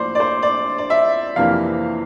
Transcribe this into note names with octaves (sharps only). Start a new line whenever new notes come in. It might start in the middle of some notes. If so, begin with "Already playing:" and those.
Already playing: A2 F3 A#3 C5 D5
D5
C5
D5
D5
E5
F2 C3 E3 A#3 F5